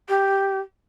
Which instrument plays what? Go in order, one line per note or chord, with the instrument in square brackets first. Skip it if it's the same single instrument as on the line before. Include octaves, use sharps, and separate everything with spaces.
[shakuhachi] G4